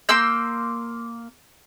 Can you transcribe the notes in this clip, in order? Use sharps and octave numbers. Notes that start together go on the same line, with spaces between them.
A#3 C6 E6 G6